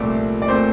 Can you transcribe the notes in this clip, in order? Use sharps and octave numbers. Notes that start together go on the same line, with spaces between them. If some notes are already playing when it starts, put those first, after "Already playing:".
Already playing: C2 A#2 F3 A3 D5
D5
A#2 A3 C4 C5